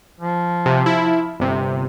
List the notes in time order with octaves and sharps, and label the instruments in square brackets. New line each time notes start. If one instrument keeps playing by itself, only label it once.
[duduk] F3
[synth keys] C3
E4
G1 C3